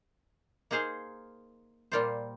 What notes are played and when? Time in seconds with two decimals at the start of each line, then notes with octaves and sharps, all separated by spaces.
0.71 A#3 D#4 G#4 C5 F5
1.92 A#2 G3 A#3 F4 C5